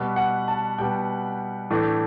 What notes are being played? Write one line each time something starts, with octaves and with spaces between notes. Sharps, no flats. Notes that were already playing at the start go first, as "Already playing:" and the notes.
Already playing: B2 G3 B3
F#5
A5
B2 G3 B3 G5
A2 E3 A3 D4